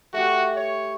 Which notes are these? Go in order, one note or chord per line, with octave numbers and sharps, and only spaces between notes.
A3 F#4 G4
C#5